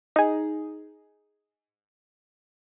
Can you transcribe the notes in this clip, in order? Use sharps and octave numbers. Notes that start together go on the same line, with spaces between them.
D#4 G#4